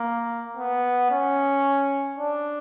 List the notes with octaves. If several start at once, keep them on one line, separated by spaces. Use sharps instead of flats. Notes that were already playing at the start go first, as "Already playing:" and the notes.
Already playing: A#3
B3
C#4
D4